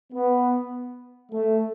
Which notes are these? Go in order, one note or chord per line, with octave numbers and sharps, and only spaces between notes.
B3
A3